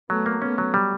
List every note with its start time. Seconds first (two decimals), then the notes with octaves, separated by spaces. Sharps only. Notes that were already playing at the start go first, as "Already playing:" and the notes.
0.09 F#3 A3 B3
0.26 A#3
0.42 A3 B3 C#4
0.58 F#3
0.74 G3